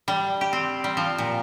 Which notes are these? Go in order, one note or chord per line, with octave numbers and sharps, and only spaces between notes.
G3
G4
C4
G3
F3
A#2